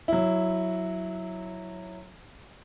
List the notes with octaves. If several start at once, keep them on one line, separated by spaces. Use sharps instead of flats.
F#3 E4